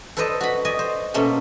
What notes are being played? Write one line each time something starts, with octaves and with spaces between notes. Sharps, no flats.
A4 B4 C5 D5 D#5
F#4 B5
D5 D#5 G#5
C5
B2 A3 A#3 C#4 F4